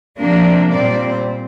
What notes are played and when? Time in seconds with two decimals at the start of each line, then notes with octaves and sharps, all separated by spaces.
0.18 C3 F3 A#3 D4
0.72 A#2 G3 C4 D5